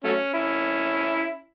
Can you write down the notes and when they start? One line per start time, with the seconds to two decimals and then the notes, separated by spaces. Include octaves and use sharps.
0.04 F#3 A3 C#4
0.34 C#4 E4